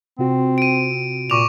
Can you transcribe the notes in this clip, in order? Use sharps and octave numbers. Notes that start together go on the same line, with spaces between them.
C3 C4 F4 F#4
D7 D#7
A#2 C#6 D6 F7